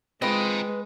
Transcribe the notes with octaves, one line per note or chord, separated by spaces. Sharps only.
G#3 C4 F4 B4 D#5 G5